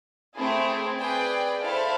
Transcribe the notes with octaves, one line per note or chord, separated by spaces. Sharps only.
A3 C4 E4 G#4
G#4 B4 D5 G5
E4 A4 C5 F5